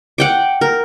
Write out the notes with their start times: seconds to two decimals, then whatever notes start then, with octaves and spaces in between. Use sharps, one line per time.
0.18 F#5 G5 D6
0.61 A#4